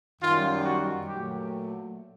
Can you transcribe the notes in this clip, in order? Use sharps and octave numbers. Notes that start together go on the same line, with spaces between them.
F#2 D#3 G3 F4
F#4
A#2 F#3 A3 G4